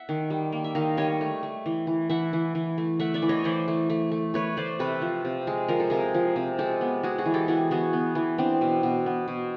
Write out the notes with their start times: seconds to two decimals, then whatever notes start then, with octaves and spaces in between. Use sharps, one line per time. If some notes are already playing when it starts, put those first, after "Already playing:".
Already playing: E5 F#5
0.09 D#3
0.30 G3
0.52 A#3
0.64 E5
0.75 D#3 D#5 F5
0.97 G3 C#5 D#5
1.21 A3
1.43 A3
1.66 E3
1.87 E3
2.10 E3 E5 F#5
2.33 E3
2.55 E3
2.78 A3
3.00 A3 E5 F#5
3.14 D5 E5
3.22 E3
3.29 C#5 D#5
3.44 E3 C5 D5
3.68 A3
3.90 A3
4.12 A3
4.34 A3 B4 C#5
4.57 A3 C5 D5
4.79 C3 A4 B4
5.02 F3
5.25 C3
5.47 G#3
5.68 F3 A#4
5.80 A4
5.90 C3 G#4 A#4
6.14 F3
6.36 C3
6.59 G#3 G4 A4
6.81 B3
7.03 G#3 F#4 G#4
7.18 F#4 G#4
7.26 E3
7.34 G4 A4
7.48 E3 F#4 G#4
7.71 B3 F#4 G#4
7.93 B3
8.15 E3
8.38 B3 C4 D4
8.61 B2
8.83 B2
9.06 B3
9.28 B2